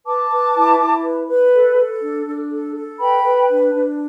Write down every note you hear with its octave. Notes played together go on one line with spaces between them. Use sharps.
B4 A5 D6
B4
E4
E4
B4
B4
A4
A4
D4
D4
A4
A4
B4 G5 B5
B4
D4
D4